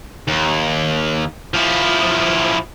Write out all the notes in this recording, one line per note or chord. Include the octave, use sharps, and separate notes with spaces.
D#2
F3 E4